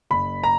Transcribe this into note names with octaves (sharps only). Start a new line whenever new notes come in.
F#1 B5
A#5